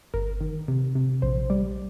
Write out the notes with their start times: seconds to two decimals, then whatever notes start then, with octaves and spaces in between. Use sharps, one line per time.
0.14 G1 A#4
0.41 D#3
0.68 C3
0.95 C3
1.22 A#1 C5
1.50 G3 D5